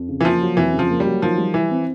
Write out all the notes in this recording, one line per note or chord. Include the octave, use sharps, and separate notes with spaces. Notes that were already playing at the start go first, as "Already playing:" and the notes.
Already playing: F2
C#3
E3
F3 A#3
F#3
F2 E3
C#3
F3
A#3
G3
F#3
D#3 F3
G3
E3 E4
C4